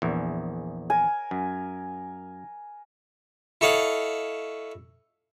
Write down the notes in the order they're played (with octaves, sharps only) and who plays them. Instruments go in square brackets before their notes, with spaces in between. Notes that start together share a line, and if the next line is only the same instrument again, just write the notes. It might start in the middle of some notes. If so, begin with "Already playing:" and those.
[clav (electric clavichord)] A#1 E2
[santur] A#4 G#5
[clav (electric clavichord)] F#2
[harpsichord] E4 A4 C#5 D#5 F5 F#5